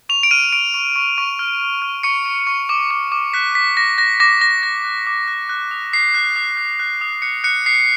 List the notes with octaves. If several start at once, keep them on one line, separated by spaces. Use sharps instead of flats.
C#6 F7
D7
F6 D#7
C#6 D7
C#6
C#6
C#6
F6
F6
F6
C#6 C#7
C#6
C#6
D6
D6
D6
F#6 B6
F#6 B6
D6 A#6
F#6 A#6
D6 A#6
D6 A#6
F#6 A#6
F#6
D6
F#6
F#6
D#6
D#6 C7
F#6
D#6
F#6
F#6
D#6
F#6 C#7
F#6 C#7
D#6 C7